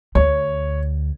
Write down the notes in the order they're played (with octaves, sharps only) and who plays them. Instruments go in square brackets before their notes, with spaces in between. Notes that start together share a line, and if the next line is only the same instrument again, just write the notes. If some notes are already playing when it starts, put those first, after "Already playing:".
[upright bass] D2 [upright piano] C#5